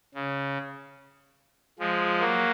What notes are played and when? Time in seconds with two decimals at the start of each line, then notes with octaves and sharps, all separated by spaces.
0.14 C#3
1.79 F3 G#3
2.21 F#3 A#3